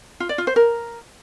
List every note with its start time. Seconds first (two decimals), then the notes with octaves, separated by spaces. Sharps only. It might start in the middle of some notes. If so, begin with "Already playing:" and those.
0.20 F4
0.29 D5
0.38 F4
0.47 C5
0.56 A#4